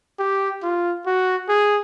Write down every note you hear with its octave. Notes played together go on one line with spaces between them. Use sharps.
G4
F4
F#4
G#4